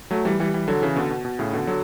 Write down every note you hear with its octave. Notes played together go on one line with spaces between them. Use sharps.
F#3 A3
E3 G3
E3 G3
E3 G3
D3 F#3
C#3 E3
B2 D3
B2
B2
A2 C#3
B2 D3
D3 F#3